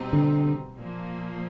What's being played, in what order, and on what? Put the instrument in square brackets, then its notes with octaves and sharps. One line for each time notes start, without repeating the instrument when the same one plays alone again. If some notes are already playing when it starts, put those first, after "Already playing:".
Already playing: [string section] B2 G3 C4 D#4
[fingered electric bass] D3
[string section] A#2 F3 A#3